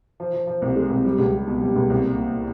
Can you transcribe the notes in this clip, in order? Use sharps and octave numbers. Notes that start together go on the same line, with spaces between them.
F3
F3
F3
C2
G#3
C2
G3
C#2
G3
B2
G3
C#2
C2
A#2
A#2